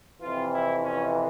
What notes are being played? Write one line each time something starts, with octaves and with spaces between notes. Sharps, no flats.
F2 C3 E3 F4
E4
C#4